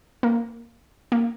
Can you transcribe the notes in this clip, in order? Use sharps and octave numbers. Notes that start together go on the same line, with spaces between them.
A#3
A#3